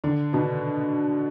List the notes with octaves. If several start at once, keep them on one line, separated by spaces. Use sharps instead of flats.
D3 D4
B2 B3